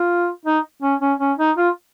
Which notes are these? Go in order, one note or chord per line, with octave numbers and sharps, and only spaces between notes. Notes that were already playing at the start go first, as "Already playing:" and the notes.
Already playing: F4
D#4
C#4
C#4
C#4
D#4
F4